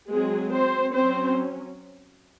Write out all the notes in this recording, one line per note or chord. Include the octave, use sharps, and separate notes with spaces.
F#3 G#3 C4 G#4
C4 C5
C4 C#4 C5
F#3